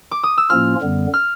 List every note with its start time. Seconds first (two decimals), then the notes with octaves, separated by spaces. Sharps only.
0.11 D6
0.23 D#6
0.38 E6
0.50 A2 F3 A#3 C#4 F4 F6
0.82 F#2 D3 G3 B3
1.14 F6